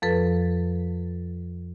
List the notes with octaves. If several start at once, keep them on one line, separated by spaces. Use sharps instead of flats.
F2 F3 A4 B4